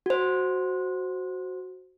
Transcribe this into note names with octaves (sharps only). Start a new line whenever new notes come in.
F#4 C5